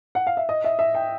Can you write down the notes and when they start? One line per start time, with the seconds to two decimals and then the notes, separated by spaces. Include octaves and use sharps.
0.15 F#5
0.27 F5
0.37 E5
0.49 D#5
0.64 E5
0.79 E5
0.95 G5